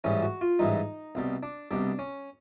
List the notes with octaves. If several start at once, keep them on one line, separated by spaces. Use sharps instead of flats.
A1 G#2 E3 G3 C#4
F#4
F4
A1 G#2 E3 G3 D#4
C2 B2 G3
D4
C2 B2 G3 D4
C#4